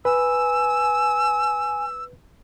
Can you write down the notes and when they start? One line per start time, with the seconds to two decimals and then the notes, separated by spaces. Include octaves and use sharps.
0.05 B4 G#5 E6